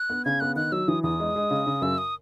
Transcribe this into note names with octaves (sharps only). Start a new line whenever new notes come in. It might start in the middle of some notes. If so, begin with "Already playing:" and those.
Already playing: F#6
B3
C#3 G#6
B3 F#6
D#3 F#6
F#3 E6
E3 D#6
E2 D#6
G#3
G#3
C#3
C#3
F#2 E6
D#6